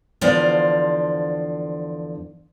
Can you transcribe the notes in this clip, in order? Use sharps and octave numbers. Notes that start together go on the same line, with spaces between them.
E2 D3 F3 C5 D5 F5